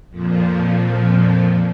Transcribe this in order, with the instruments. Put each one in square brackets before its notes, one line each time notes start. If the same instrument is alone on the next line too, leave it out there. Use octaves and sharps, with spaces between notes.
[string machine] F2 A#2 F3